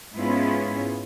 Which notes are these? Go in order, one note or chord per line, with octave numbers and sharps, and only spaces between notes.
G#2 B3 C#4 E4 F4 G#4